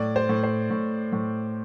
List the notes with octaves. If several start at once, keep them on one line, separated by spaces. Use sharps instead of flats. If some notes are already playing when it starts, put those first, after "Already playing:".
Already playing: A2 D5
C5
A2
C5
A2
A2